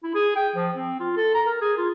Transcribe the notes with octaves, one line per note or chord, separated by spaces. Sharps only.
E4
G#4
G5
F3
C4
F4
A4
A#5
A#4
G#4
F4